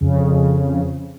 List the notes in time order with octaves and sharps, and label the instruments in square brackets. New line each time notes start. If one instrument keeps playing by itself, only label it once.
[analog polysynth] F2 C#3